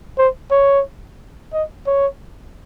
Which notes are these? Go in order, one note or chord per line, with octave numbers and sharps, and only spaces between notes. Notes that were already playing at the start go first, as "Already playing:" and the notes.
C5
C#5
D#5
C#5